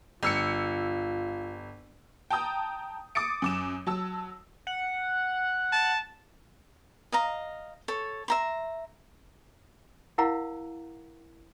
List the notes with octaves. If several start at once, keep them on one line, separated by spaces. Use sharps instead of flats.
G1 F4 E6 C#7
G5 A5 A#5 D#6 G6
D6 D#6 A6 C#7 D7
F#2 D6 E7
F#3 A5 E6
F#5
A5
D#5 F5 A#5
A4 C#5
E5 A#5 C6
E4 A#4 F5 F#5 A#5